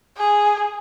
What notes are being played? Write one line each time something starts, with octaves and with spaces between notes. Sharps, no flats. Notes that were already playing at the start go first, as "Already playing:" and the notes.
G#4